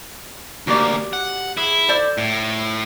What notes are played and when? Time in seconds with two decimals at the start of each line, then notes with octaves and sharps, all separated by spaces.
0.67 D2 A#3 F#4 G4 D5
1.13 F#5
1.57 E4 G#4
1.88 A4 C5 D5
2.18 A2